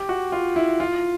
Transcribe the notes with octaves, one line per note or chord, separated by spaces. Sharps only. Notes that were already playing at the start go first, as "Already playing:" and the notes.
Already playing: G4
F#4
F4
E4
F4